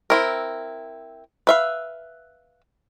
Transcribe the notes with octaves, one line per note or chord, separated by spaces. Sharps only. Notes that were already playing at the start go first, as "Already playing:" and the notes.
C4 E4 A#4
B4 E5 F5